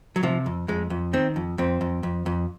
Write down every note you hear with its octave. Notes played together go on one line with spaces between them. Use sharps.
F#3
C3 F3
F2
F2 G#3
F2
D#3 C4
F2
F2 C4
F2
F2
F2